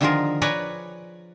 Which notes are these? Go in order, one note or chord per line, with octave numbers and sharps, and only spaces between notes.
D3 D#3 F3 F4 G#4 A#4
B4 C#5 D5 G#5 A#5